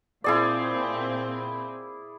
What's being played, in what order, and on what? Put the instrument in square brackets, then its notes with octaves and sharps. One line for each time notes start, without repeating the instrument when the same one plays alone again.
[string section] A#2 C4 [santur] E4 G#4 D5